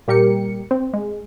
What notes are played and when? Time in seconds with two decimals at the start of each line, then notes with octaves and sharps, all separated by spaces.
0.08 A#2 G3 G4 A#4 C#7
0.71 C4
0.93 G#3